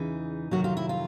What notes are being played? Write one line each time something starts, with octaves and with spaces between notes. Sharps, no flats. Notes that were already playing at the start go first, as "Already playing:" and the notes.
Already playing: E2 C#3 E3 D#4
F2 C3 D#3 F#3 F#4
F4
E4
F4